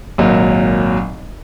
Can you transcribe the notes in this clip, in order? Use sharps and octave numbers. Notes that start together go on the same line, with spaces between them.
G#1 A#2 F#3